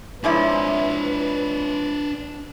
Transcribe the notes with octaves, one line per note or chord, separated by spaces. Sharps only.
G#2 F3 D4 E4 B4 C#5